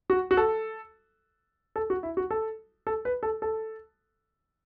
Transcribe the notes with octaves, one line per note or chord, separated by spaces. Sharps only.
F#4
F#4
A4
A4
F#4
E4
F#4
A4
A4
B4
A4
A4